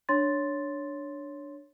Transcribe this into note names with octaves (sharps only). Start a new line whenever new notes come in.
D4 C#5 C6 A6